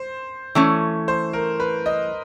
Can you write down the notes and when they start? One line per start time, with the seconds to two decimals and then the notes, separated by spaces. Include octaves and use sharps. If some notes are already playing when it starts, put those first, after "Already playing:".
Already playing: C5
0.55 E3 A3 C#4
1.08 C5
1.33 A#4
1.60 B4
1.86 D#5